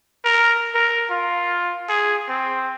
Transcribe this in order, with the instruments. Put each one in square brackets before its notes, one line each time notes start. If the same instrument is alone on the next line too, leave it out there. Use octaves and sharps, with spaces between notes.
[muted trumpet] A#4
A#4
F4
G#4
C4